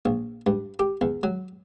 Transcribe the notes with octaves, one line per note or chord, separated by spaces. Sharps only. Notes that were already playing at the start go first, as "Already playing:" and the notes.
A#1
G2
G4
E2
F#3